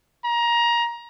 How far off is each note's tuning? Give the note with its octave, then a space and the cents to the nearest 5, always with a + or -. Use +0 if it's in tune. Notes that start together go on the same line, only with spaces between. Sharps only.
A#5 +20